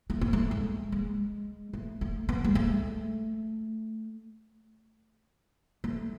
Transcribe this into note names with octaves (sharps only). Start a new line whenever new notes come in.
A3
B3
A3
G#3
G#3
A3
A3
B3
G#3
A3
A3